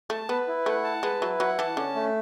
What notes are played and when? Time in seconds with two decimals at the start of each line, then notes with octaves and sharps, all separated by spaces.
0.10 A3 A5
0.29 B3 B4
0.47 E4
0.66 A3 F#5
0.84 A5
1.03 G#3 B4
1.21 F#3 E4
1.39 F#3 F#5
1.58 E3 A5
1.77 D3 C#4
1.95 A3